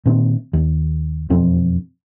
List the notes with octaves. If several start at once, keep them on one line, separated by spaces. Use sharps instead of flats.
A#2 D#3 C4
D#2
E1 F2 C4